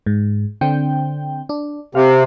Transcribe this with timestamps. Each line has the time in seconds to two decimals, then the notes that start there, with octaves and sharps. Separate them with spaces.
0.06 G#2
0.61 D3 C4 G5
1.49 D4
1.95 C3 F5